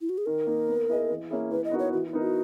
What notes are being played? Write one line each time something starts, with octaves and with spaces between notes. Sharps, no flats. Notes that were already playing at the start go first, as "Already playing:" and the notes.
E4
F#4
G#4
D#3 A#4
A#3 D#4
B3
E4 G#4 D#5
E3
A#3 C#4 E4 G#4
E3 B4
D#5
B3 D#4 F#4 A#4
C#5
E3 F#4
E4
B3 D#4 A#4
F#4